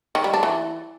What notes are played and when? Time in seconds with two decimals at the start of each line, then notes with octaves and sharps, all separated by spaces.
0.15 D#3
0.24 G3
0.34 D4
0.43 E3